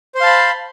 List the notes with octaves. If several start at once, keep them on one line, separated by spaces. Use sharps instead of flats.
C5 F5 A5 B5 C6